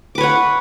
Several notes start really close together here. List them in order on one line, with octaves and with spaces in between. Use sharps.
D6 B4 C#5 F#5